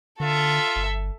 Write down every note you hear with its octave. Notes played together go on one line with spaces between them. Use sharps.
D3 F4 A4 E5
G1